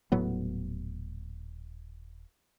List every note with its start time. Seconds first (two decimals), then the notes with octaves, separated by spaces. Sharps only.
0.12 D#1 A2 F#3 B3